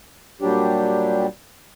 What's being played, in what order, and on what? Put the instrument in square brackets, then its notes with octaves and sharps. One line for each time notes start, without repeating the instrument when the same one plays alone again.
[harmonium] A#2 F#3 G3 D4 G4